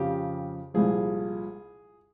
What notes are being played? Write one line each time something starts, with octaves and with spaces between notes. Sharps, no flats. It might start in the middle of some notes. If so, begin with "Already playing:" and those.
Already playing: F2 C#3 F3 G4
C2 A#2 F3 G#4